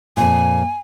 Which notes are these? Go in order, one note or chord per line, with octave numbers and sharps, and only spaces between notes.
F2 A#2 G#5